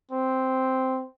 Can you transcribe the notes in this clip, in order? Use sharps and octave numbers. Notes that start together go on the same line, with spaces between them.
C4